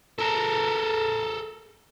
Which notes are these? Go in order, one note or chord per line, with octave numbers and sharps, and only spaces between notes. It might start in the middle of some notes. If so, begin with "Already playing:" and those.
A4 A#4